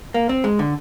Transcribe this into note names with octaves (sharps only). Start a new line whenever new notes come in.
A#3
C4
G#3
D3